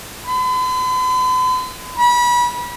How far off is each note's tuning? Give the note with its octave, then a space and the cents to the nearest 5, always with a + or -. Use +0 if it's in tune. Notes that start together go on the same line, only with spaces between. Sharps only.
B5 +45
B5 -30